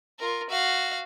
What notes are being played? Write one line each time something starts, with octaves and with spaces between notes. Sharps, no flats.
F4 A#4
F#4 F5